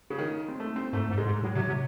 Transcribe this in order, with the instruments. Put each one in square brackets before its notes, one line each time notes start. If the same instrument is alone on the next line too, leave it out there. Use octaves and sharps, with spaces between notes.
[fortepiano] C#3
D#3
C4
A3
C4
[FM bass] G#2 [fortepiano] A3
[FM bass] G#2
[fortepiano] G#3
[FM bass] G#2
[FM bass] A2 [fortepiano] F#3
[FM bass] C3 [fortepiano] F#3
[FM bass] C3 [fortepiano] F#3